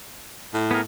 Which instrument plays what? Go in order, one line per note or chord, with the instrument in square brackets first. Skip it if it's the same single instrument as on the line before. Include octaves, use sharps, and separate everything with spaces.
[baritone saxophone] A2
[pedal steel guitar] B3 G#4 A#4